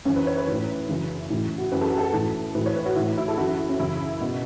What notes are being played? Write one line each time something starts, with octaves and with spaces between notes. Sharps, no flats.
F#2 E3 C#4
B4
C#5
B4
A2 E3
F#2 C#3 E3
A2 E3
F#4
F#2 E3 B4
A4
F#4
A4
A2 E3
A2 E3 B4
C#5
B4
F#4
A2 E3 E4
E4
A4
F#2 E3 F#4
E4
C#4
F#2 C#3 E3 E4
B2